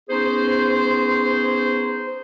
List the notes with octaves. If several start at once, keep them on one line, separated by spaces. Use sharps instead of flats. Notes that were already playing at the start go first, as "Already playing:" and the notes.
B3 C#4 D#4 G#4 C5